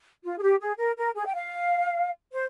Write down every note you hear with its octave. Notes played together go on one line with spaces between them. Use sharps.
F4
G#4
G4
G#4
A#4
A#4
G#4
G5
F5
C5